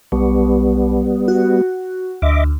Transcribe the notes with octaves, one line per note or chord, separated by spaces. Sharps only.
B1 G3 B3
F#4
D2 D#5 E5 D6